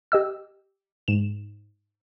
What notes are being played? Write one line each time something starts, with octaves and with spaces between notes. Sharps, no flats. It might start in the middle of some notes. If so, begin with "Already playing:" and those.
G4 D#5 E6
G#2 E7